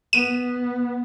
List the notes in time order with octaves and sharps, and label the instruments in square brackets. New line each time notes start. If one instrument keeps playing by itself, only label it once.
[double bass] B3 [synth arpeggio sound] D#7